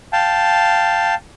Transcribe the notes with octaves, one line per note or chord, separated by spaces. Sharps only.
F5 G5 A5